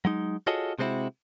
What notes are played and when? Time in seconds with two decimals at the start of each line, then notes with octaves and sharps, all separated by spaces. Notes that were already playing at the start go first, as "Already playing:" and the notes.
0.05 F#3 G#3 D#4
0.47 F4 F#4 G#4 A4 C#5 D#5
0.79 C3 G#3 C4 C#4 E4 F#4